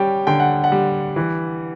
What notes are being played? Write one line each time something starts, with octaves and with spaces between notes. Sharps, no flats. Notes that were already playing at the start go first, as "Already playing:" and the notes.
Already playing: G3 C#4 G5
D3 G5
F#5
F#5
G3
E3